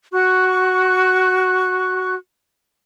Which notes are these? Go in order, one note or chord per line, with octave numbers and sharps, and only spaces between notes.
F#4 C#6 F#6